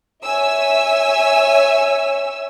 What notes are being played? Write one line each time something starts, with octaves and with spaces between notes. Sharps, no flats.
C#5 E5 G#5 E6